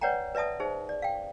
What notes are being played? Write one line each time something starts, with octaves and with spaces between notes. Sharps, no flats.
B4 C#5 D5 F#5 G5 A#5
B4 D5 E5 A5 D#6
D#4 G#4 C5
D5
F5 G5